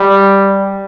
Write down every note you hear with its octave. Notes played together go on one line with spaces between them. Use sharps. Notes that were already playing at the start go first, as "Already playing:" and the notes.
Already playing: G3